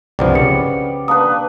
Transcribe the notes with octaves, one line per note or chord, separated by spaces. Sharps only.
C2 G2 F3 G3 B3 D5
C#3 D5 C#7
A#3 D4 B4 D#6